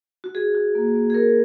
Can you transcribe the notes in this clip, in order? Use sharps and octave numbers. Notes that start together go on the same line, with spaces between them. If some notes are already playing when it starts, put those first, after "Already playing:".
F#4
F#4 G#4
F#4
A#3
A#3
G#4
A#3 A#4